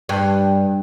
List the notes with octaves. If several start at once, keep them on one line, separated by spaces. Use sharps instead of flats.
G2